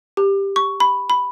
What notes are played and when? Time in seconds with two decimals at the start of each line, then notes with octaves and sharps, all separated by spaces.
0.17 G4
0.56 C#6
0.80 B5
1.10 B5